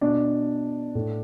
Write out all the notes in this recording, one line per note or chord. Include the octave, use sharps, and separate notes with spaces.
B2 D4
A2